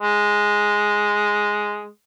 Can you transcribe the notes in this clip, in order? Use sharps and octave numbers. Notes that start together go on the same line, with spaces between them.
G#3